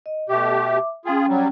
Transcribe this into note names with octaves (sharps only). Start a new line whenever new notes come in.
D#5
B2 A3 G4 E5 D6
C#4 F4 G#4 G5
F#3 G3